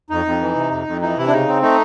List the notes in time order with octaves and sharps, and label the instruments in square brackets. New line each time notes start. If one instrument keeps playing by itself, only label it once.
[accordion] F2 D#4
F2
E3
C3
F2
F2
E3 D#4
C3 E4
D4
C#3 D#4
C4
A3 D#4